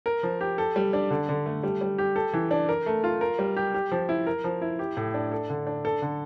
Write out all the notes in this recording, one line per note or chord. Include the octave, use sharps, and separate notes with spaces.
A#4
F3
G4
A4
G3
D4
D3
D3
A3
G3
G3
G4
A4
E3
D4
A#4
A3
F4
A#4
G3
G4
G4
F3
E4
A#4
F3
E4
G4
A2
D4
A4
D3
D4
A4
D3